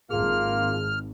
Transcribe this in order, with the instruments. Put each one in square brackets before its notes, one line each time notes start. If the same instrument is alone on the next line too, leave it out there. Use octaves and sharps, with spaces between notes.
[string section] G#1 [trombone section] A#3 F4 [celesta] G#4 [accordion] F6